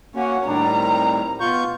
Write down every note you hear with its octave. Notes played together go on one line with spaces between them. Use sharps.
A#3 C#4 F#4 C#5 F#5
A2 D#3 G3 D4 A#5
C4
B2 F4 C#6 G6